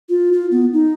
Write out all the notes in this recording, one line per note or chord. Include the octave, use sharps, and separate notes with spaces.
F4
F4
B3
D#4